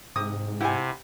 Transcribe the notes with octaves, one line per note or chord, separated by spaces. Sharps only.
G#2 C3 D#6
C3 E4 G4 F#5 G#5